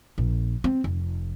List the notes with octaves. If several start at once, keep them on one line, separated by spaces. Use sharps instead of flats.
A#1
C4
F1